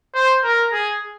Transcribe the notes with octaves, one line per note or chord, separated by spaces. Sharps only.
C5
A#4
G#4